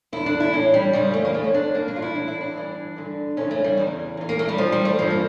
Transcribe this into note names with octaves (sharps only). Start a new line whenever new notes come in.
E2 D3 E4
D4
E4
A2 E3 C#4
G3
F2 C#3 E3 G3
A3
A#3
F2 D3 A3
C#4
D4
G2 E3 A#3
D4
F4
E4
A2 E3 D4
E4
D4
G2 E3
G2 D3
F2 C#3 E3 C#4
A3
G3
E2 C#3 E3
E2 E3
A#3
A3
G3
F2 E3 F3
G3
A3
G2 E3 F3
A#3